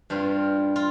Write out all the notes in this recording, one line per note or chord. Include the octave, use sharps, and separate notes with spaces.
G2 G3 C4 F4
F4